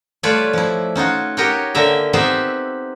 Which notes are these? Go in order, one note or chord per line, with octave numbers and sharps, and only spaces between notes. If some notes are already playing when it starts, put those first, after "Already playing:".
G3 A3 F4 B4 C#5 D5
F3 E4
C#4 D#4 F4 F#4
F#4 G4 A#4 C#5 D#5 G5
D3 A#3 E5 G5 A#5
B3 C4 D#4 G4 C5 E5